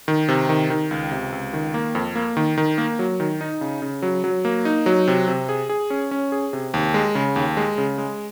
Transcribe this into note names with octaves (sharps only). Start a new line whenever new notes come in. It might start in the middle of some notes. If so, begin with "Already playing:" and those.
D#3
C3
D#3
D#3
C#2
C3
C#2
D#3
A#3
F2
A#3
D#3
D#3
A#3
F#3
D#3
D#4
C#3
C#3
F#3
F#3
A#3
D#4
F#3
C3
C3
G#4
G#4
C#4
C#4
G#4
C3
D#2
G#3
C#3
D#2
G#3
C#3
G#3